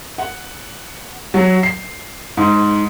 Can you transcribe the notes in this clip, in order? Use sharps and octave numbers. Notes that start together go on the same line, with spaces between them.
F#5
F#3
C7
G#2